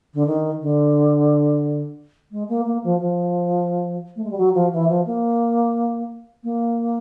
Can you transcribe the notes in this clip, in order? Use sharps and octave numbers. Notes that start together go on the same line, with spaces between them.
D3
D#3
D3
G#3
A#3
A#3
F3
F3
A3
G#3
G3
F#3
F3
E3
F3
A#3
A#3